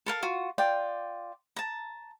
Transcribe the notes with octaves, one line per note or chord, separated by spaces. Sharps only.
A4 A#4 F5
F4 F#4
F4 D5 G5
A5 A#5